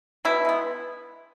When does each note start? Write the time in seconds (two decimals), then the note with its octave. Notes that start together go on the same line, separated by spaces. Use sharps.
0.25 B2 E4
0.45 G#3 B3